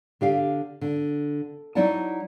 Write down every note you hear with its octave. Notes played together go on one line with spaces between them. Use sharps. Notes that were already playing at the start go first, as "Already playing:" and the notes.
D3 G4 F5
D3
F#3 D#4 E4 D5 F#5 A5